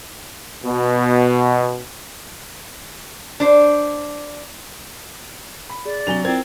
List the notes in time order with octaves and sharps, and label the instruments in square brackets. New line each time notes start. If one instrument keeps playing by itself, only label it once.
[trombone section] B2
[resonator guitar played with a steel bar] D4 C5
[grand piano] B5
[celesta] G#4 [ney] D5
[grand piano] C3 F#3 F7 [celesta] D4 G#5 G7
[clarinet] C4 [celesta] E4 F4 C5 [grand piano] A#4 G#6